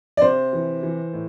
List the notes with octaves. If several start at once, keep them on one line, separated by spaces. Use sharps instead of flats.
D5
C3 C5
E3
E3
A2